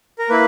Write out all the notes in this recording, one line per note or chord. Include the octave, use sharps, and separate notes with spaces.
A#4
A#3 E4 B4